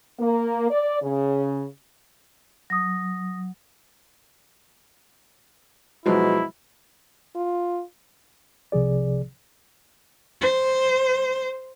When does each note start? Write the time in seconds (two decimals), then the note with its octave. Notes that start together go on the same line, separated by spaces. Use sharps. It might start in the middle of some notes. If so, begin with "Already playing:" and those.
0.20 A#3
0.71 D5
1.02 C#3
2.70 F#3 D#6 A#6
6.06 B2 F3 F#3 G#3 E4
7.36 F4
8.72 C2 C3 F3 G#4 D5
10.41 C5